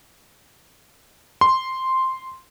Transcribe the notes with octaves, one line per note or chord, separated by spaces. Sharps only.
C6